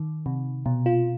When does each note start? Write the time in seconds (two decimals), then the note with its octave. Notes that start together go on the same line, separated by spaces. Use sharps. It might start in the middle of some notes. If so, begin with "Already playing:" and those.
Already playing: D#3
0.26 C3
0.66 B2
0.86 F4